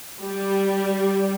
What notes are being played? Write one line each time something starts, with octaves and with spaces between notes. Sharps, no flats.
G3